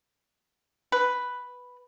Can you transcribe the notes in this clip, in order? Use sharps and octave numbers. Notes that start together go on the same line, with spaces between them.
B4